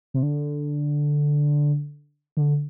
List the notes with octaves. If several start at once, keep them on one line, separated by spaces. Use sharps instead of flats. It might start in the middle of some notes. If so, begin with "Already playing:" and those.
C3
D3
D3